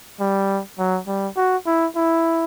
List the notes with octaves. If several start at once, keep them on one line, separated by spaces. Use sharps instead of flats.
G3
F#3
G3
F#4
E4
E4